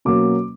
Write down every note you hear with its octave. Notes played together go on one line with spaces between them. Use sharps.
B2 F#3 A#3 C#4 D6